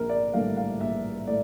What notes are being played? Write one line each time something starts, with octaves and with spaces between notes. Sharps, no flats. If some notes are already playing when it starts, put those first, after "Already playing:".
Already playing: A#1 A#4
D5
A2 G3 A#3 D4 F5
F5
A#1 E5
A2 D5